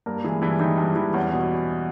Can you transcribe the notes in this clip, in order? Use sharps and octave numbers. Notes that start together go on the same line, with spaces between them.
G2 A#3 A#4
E3 G#3 G#4
G2 E3 E4
D#3 E3 D#4
G2
E3
E2 C#4
B2